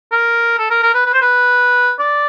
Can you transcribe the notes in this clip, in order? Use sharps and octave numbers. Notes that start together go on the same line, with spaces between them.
A#4
A4
A#4
A#4
B4
B4
C5
B4
D5